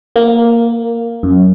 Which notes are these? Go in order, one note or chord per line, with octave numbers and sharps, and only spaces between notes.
A#3
F#2